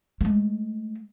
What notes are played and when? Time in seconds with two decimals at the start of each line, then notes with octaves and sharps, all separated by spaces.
0.21 G#3 A3